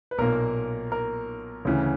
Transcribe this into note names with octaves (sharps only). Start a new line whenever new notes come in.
B4
B1 A#2 A#3 A#4
A#4
D2 C#3 E3